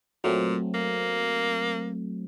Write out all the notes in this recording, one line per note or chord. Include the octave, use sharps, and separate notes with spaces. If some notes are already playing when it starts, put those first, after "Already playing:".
A#2 F#3 A3 C4
A#3